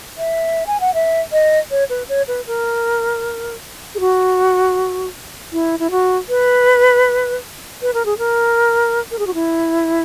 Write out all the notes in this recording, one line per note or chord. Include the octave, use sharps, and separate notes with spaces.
E5
G#5
F#5
E5
D#5
C#5
B4
C#5
B4
A#4
G#4
F#4
E4
E4
F#4
B4
B4
A#4
G#4
A#4
A#4
G#4
F#4
E4